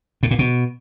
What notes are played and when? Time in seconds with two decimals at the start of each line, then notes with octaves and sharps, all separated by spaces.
0.23 A2
0.31 A#2
0.39 B2